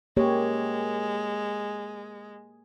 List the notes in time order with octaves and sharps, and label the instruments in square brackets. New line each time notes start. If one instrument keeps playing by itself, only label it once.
[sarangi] G#3 [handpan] A#3 G4 C#5